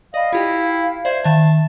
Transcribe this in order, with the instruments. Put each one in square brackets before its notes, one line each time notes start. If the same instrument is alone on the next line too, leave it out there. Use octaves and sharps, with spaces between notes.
[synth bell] D5 B5 [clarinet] D#5 [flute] F5
[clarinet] E4 [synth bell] F4 G4 G5
[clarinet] C5 [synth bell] D5 E5 G#6
[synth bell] D#3 E5 [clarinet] A5